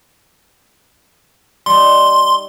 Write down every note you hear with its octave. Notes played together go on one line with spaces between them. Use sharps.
G3 D#4 C6